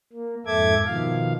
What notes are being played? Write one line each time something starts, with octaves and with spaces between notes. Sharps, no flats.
A#3
F2 G#2 A4 E5 D6 G#6
B2 D#3 F3 F5